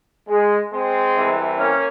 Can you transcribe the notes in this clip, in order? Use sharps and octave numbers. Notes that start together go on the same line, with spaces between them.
G#3
G#3 C4
C2 C3 E3
A#3 C#4